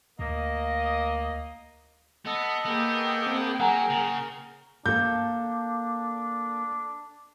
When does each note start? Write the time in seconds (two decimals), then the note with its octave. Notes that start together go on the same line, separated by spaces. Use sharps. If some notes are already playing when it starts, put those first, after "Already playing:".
0.19 D2 A#3 D#5
2.26 B3 A4 D#5
2.66 A#3 B3 G#4 G5
3.26 C4
3.60 F#3 A#4 F#5 G#5 A#5
3.90 C#3
4.86 A#3 D4 A4 G6